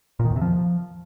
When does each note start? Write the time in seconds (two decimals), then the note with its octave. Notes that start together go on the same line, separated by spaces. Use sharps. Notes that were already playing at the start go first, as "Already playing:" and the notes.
0.20 A#2
0.25 D#3
0.30 E2
0.36 C3
0.41 F3